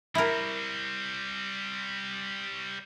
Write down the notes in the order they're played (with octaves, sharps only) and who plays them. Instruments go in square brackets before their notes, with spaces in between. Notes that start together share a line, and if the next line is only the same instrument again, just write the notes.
[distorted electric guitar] G3 C4 [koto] E4 A#4